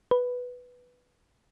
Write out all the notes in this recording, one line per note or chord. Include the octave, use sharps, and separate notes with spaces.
B4